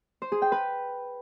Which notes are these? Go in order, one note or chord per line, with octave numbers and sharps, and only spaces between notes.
C5
G#4
G5
B4